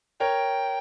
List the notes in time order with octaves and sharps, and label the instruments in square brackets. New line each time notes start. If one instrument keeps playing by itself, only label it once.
[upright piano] A#4 C#5 [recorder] G5